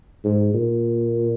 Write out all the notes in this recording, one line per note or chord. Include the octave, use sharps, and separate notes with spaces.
G#2
A#2